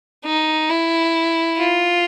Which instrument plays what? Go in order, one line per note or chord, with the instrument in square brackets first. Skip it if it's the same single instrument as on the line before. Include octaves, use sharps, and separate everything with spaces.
[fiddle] D#4
E4
F4